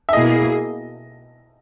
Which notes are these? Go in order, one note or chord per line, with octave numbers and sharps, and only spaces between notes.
E5
B2 A#3 E4 G#4 D#5